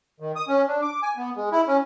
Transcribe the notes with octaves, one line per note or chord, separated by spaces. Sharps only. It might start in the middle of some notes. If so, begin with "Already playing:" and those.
D#3
D#6
C#4
D4
D6
G#5
B3
G#3
E4
C#4